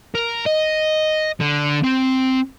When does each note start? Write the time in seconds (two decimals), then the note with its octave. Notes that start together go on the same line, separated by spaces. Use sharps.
0.15 A#4
0.46 D#5
1.40 D3
1.84 C4